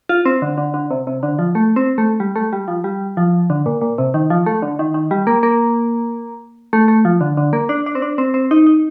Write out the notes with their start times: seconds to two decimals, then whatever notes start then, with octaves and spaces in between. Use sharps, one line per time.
0.09 F4
0.25 C4
0.42 D3
0.58 D3
0.74 D3
0.91 C3
1.07 C3
1.23 D3
1.39 F3
1.55 A3
1.76 C4
1.98 A3
2.20 G3
2.36 A3
2.53 G3
2.68 F3
2.84 G3
3.17 F3
3.50 D3
3.66 A#2
3.81 A#2
3.98 C3
4.14 D#3
4.30 F3
4.46 A3
4.62 D3
4.79 D#3
4.94 D#3
5.11 G3
5.27 A#3
5.43 A#3
6.73 A3
6.88 A3
7.05 F3
7.21 D3
7.37 D3
7.53 A#3
7.69 D4
7.86 D4
7.95 C4
8.02 D4
8.18 C4
8.34 C4
8.51 D#4
8.67 D#4